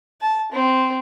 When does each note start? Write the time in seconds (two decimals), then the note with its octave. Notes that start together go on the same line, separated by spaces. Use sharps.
0.21 A5
0.52 C4